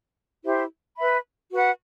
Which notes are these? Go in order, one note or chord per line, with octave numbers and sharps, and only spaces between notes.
E4 G4 C5 E5
B4 E5 B5
F#4 B4 F#5